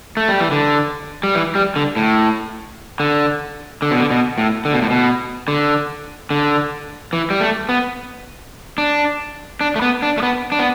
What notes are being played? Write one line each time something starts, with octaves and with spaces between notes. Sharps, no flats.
A3
G3
E3
D3
G3
E3
G3
D3
A2
D3
D3
B2
D3
B2
A2
D3
B2
A2
B2
D3
D3
E3
G3
A3
B3
D4
D4
A3
B3
D4
A3
B3
D4
B3